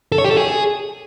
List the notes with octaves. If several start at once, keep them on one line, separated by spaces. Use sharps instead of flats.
A4
C#5
G4
A4
G#4